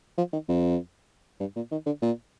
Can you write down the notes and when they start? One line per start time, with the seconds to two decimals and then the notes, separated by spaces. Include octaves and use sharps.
0.18 F3
0.33 D#3
0.49 F2
1.40 G2
1.56 A#2
1.71 D#3
1.86 D3
2.02 A#2